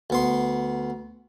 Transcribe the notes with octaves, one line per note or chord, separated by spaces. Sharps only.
D2 B3 C6